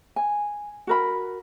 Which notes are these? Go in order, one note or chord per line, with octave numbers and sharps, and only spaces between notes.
G#5
F#4 A#4 B5